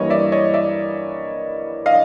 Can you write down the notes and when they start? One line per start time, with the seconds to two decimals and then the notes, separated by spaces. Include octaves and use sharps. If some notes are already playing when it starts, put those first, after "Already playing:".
Already playing: G2 E3 G3 A#3 C#5 D#5
0.10 D5 E5
0.32 C#5 D#5
0.54 D5 E5
1.86 D#5 F5